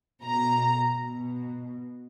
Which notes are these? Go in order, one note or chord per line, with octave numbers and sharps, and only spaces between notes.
B2 A#5
B2